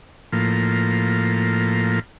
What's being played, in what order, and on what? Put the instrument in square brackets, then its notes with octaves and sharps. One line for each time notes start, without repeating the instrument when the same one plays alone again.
[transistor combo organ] A2 F3 A#3